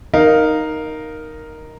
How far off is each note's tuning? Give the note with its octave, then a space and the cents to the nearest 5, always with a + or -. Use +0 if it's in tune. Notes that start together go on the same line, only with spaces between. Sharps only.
D#4 +0 A#4 +0 F5 +5